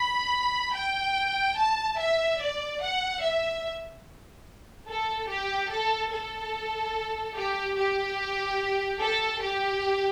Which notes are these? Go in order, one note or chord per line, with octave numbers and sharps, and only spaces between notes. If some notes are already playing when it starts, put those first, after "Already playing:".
Already playing: B5
G5
A5
E5
D5
F#5
E5
A4
G4
A4
A4
G4
G4
A4
G4